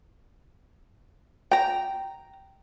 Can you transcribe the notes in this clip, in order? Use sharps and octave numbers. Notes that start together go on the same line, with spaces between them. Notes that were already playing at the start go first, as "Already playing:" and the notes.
G5 A#5